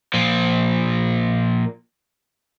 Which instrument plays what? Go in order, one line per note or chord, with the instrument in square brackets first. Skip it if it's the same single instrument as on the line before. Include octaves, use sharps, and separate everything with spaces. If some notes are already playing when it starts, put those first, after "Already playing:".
[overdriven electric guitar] A#2 F3